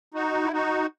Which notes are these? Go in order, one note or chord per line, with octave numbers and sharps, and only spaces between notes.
D#4 F#4
E4
D#4 F#4